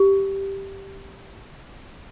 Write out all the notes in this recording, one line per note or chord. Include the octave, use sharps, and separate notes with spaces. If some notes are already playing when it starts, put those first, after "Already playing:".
Already playing: G4